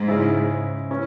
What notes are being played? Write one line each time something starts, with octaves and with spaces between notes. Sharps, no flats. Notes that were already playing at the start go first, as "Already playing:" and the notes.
Already playing: G#2
C#3 G#3 C#4 E4
C#4 E4